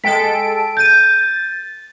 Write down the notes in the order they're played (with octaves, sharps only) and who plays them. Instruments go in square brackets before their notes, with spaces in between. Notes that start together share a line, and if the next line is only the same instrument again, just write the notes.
[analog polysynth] G#3 A4 D7 [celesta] G5 B6
[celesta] G6 D#7 [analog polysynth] A6